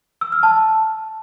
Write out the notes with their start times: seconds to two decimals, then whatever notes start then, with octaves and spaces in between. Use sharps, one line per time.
0.21 E6
0.32 F6
0.43 A5